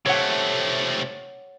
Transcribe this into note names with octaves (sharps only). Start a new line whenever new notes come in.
C3 A3 C#5 F#5